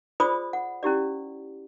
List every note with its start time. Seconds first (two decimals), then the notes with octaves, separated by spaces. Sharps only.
0.20 F4 G#4 C5 D5 B5 D#6
0.53 F#5
0.83 C#4 E4 G4 D5